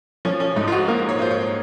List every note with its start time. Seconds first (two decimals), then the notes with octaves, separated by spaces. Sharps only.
0.25 F3 C#4
0.40 C#4
0.56 G#2 D#4
0.67 F4
0.72 F#4
0.88 A#3 A#4
1.09 C#5
1.19 F4 C5
1.30 C#5